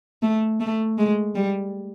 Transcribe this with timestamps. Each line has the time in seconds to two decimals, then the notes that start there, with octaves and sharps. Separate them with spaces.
0.22 A3
0.60 A3
0.98 G#3
1.35 G3